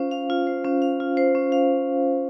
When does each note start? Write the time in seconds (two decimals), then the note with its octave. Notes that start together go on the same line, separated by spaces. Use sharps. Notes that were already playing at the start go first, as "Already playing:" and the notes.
Already playing: C#4 F4 C5 F5
0.11 F5
0.30 F4
0.47 C5
0.64 C#4
0.82 F5
1.00 F4
1.17 C5
1.35 C#4
1.52 F5